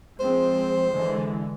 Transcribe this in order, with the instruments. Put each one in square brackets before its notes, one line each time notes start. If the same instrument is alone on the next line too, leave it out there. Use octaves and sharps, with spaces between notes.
[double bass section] F3 G#3 C4 [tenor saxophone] C5
[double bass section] D3 E3 G#3